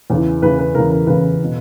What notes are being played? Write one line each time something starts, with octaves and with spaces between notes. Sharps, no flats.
E2 C#3 E3
E2 C#3 E3 B4
B4
E2 C#3 E3 A#4
A#4
E2 C#3 E3 B4
B2